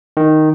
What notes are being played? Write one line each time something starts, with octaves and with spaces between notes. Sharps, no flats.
D#3